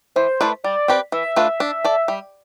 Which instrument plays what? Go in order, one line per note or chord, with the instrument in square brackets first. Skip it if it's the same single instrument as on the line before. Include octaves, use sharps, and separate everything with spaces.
[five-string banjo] E3 [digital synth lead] C5
[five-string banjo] A3 E4 B4 D5
[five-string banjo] G3 [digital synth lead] D5
[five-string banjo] C4 G4 B4
[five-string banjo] E3 [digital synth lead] E5
[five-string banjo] A3 D4 F4 B4
D4
A4 D5
G3